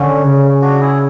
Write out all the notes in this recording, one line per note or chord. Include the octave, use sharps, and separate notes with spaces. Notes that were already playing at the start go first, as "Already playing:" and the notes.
Already playing: D3 C#4
C#3
D4 F#4
E4 G#4